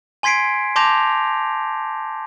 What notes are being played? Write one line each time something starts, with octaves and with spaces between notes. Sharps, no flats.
G#5 C6 G#6 B6 C7 D7
A5 C6 D6 G6 A#6 F7